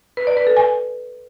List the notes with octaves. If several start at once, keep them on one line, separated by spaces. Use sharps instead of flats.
B4
D5
B4
A4
G#5